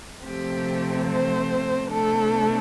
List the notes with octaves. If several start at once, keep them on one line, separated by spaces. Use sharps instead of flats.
C3 F3 A3 C4 G4
C5
C3 A3 D4 A4